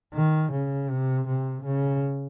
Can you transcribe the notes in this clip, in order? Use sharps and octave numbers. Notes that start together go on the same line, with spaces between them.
D#3
C#3
C3
C3
C#3